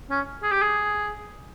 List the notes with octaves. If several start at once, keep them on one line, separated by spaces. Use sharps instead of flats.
C#4
G#4
G4
G#4